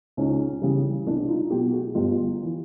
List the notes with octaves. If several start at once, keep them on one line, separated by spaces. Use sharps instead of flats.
C#2 C#4 D#4
C#3 E3 G3
C2 D4 E4
D#4 F4
B2 F#3 F4 G4
F#4 G#4
G1 F4 G4
E3